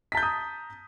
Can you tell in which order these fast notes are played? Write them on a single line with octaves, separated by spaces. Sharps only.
B6 A5 G6 A#5 D#6